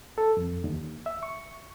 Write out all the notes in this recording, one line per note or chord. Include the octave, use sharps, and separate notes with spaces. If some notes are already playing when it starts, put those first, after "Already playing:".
A4
F2
D#2
E5
C#6